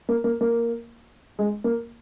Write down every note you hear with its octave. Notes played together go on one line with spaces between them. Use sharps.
A#3
A#3
A#3
G#3
A#3